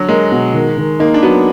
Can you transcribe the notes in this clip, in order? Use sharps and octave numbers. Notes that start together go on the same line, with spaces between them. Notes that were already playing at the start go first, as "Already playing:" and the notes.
Already playing: D3 F#3
G#3 A#4
B2
D#3
D#3
A#3 D#4
D4
F#3 B3